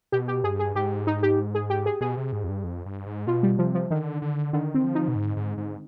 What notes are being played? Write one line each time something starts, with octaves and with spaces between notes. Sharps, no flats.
B2 G4
G4
G2 G#4
G#4
G#2 G4
D#4
G4
G#4
G4
G#4
B2 G#4
C3
G#2
F2
G2
F2
G2
G#2
B2 F4
G3
C3 F3
F3
D3 D#3
D3
D3 D#3
C4
F3
D#4
B2
G#2
G#2
G#2